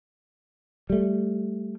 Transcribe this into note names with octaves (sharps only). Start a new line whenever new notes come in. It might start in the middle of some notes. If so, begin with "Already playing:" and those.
G3 A3